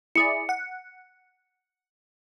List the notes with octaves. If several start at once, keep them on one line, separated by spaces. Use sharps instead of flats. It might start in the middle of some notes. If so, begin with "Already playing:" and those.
E4 G#4 D5 C#7
F#5